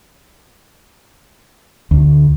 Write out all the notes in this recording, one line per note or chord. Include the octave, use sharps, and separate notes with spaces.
D2